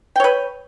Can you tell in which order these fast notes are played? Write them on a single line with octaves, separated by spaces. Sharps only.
G5 C#5 B4